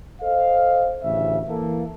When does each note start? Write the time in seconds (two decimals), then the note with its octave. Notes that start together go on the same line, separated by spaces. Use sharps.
0.22 A4 C5 D#5 F5
1.04 A1 D2 C#3 E5
1.49 E3 A#3 A4